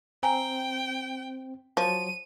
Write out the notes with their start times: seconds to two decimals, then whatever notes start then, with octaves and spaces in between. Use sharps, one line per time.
0.23 C4 G5 G#5 A#5
1.77 F3 F#3 D#7